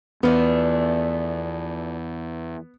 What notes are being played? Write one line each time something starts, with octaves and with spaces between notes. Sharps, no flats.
E2 F3 A3 B3 D4